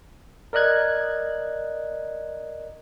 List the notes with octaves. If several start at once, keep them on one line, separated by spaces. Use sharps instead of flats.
A#4 D5 D#5 F#6 G#6